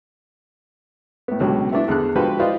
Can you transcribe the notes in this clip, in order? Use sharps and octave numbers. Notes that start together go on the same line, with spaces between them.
A2 B3
C#2 B2 D3 F#3 G4
A3 B3 D4 E4
E2 D3 F#6
D3 F3 G#3 F#4 G4 B4
E4 F4 B4 C5 D5 D#5